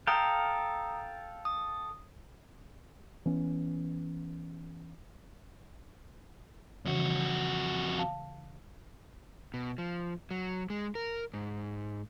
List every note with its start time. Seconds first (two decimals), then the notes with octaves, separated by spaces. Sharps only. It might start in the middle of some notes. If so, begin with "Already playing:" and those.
0.07 A4 F5 G5 A#5 D#6
1.45 D#6
3.26 E3 B3 C#4
6.85 F2 C#3 E3 F#4
7.98 F5 A5
9.54 B2
9.78 F3
10.31 F#3
10.70 G#3
10.95 A#4
11.34 G#2